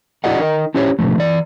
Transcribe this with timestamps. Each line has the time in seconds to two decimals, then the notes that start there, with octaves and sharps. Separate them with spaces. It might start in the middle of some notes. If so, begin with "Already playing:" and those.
0.24 E4 F#4 G#4 D5 D#5 F#5
0.39 D#4 A#4 D#5
0.74 C#4 E4 G4 C5 C#5
0.99 B2 D3 E3 F3 A3
1.18 E3 D5